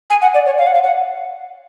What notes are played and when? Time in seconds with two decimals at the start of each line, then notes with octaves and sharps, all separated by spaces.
0.10 G#5
0.22 F#5
0.34 D5
0.46 C#5
0.58 F5
0.67 F#5
0.74 F5
0.84 F#5